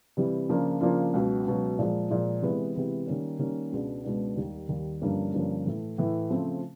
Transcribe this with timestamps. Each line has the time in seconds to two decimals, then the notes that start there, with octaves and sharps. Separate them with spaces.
0.17 C3 E3 G3
0.49 C#3 F3 A#3 D4 F4
0.81 C#3 F3 A#3 D4 F4
1.14 C#2 B2 F#3
1.47 C#2 B2 F#3
1.79 A#2 F3 G#3
2.10 A#2 F3 G#3
2.42 C3 E3 G#3 B3
2.75 C3 E3 G#3 B3
3.07 D#3 G3 A#3 C#4
3.39 D#3 G3 A#3 C#4
3.72 C#2 B2 G#3 B3 D4
4.04 C#2 B2 G#3 B3 D4
4.36 D#2 D#3 G3
4.69 D#2 D#3 G3
5.01 G2 D3 F3 A#3 C#4
5.34 G2 D3 F3 A#3 C#4
5.65 A2 E3 A3
5.98 A2 E3 A3
6.30 C#3 F3 A3 C4